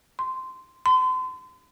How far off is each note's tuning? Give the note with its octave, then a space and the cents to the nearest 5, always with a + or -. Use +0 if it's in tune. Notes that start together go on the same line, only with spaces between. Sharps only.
C6 -10
C6 -40